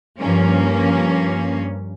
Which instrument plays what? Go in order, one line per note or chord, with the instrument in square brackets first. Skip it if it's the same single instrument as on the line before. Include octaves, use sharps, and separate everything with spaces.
[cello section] G2 F3 A#3 C#4